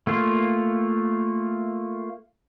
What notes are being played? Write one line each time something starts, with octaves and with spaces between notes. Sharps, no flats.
A3 A#3 F4